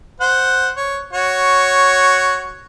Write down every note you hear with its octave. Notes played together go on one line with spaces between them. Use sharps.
C5 F#5
C#5
F#4 C#5